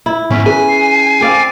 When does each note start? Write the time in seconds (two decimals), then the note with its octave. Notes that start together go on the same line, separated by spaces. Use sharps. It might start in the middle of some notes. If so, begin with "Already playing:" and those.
0.06 E4
0.30 G#2 D#3 B3 C#4 B6
0.46 G#4 B4 G#5
0.68 C7
1.21 C4 D5 F5